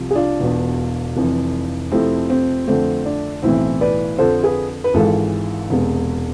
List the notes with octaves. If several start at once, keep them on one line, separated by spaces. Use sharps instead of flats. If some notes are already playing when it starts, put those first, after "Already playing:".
Already playing: C2 C3 F3
G#4
D4 F4
E1 E2 B2
F1 F2 E3
F2 C3 F3 A3 C4 E4
C4
F2 D3 A3 C4
D4
B1 A2 E3 C4 E4
B4 D5
F2 D3 F3 A4 C5
G#4 B4
B4
G#1 G#2 E3 G#3 F4 A4
E1 E2 C3 G#3